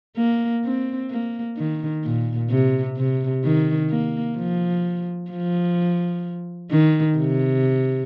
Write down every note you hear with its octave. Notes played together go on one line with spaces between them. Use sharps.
A#3
C4
A#3
D#3
A#2
C3
C3
D#3
A#3
F3
F3
D#3
C3